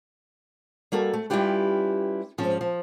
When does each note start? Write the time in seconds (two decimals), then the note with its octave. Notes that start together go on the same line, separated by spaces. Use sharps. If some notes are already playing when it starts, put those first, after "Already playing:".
0.92 G3 A#3 F#4 A4
1.13 A3
1.30 G3 C#4 E4 F4 G4 B4
2.38 G#2 F3 C#4
2.61 F3